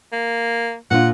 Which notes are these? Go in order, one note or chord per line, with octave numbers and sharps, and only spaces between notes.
A#3
A#2 D4 F4 F#5